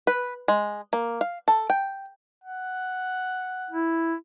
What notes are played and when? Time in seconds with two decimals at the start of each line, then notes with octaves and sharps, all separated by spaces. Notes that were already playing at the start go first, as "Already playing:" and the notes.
0.07 B4
0.48 G#3
0.93 A#3
1.21 F5
1.48 A4
1.70 G5
2.44 F#5
3.71 E4